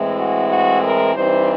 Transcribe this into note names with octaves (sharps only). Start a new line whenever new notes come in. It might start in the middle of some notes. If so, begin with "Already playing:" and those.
Already playing: A2 E3 G#3 C4
F#4
F#4
A#4
G2 E3 G3 C4 D#4 C5